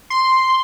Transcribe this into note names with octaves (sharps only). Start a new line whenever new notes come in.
C6